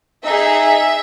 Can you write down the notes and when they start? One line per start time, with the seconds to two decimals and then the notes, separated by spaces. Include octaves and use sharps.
0.24 D#4 G#4 E5